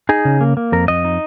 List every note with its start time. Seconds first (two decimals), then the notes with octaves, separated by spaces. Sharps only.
0.09 D#4 G#4
0.25 C#3
0.41 A#3
0.57 A#3
0.72 F2 A#4
0.88 F2 D#5
1.05 D#4